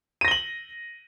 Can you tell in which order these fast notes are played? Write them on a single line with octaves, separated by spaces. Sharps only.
D#7 A#6 G7 F#7